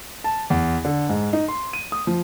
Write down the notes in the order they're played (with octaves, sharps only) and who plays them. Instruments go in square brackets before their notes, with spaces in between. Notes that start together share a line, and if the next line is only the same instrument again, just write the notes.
[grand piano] A5
E2
D3
G#2
D#4
C6
D#7
D#6
F3